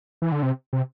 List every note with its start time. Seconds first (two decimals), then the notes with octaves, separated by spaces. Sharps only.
0.22 E3
0.32 D3
0.43 C3
0.73 C3